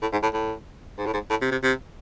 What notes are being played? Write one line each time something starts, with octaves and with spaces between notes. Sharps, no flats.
A2
G#2
A2
A2
G#2
A2
G#2
A2
C3
C3
C3